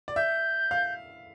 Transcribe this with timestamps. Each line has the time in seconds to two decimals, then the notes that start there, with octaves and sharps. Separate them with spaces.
0.08 D5
0.16 E5 G6
0.71 F5